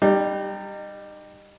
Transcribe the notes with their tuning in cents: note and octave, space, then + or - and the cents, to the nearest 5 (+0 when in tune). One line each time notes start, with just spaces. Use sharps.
G3 +0 D#4 -35